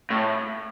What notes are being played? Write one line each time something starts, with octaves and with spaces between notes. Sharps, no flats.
A2